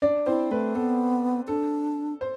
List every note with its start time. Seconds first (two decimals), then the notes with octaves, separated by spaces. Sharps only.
0.02 D4 D5
0.26 C4 E4 C5
0.51 A3 B4
0.75 B3 A4
1.48 D4 A4
2.21 C5